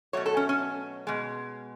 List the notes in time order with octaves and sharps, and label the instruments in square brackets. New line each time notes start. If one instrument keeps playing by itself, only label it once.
[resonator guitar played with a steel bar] B2 F#3 A3 C#5
A4
C#4
C#4
B2 G#3